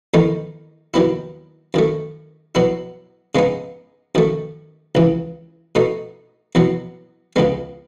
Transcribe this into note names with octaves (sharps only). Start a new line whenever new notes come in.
E2 D#3 A3 D#4
D#2 D#3 F#3 B3 E4
F#2 D#3 A3
B2 F#3 B3 E4
C#3 G#3 B3 D#4
F#2 D#3 A3
C#2 C#3 E3
B2 A3 D#4
E2 B2 F#3 B3
C#2 C#3 G#3 B3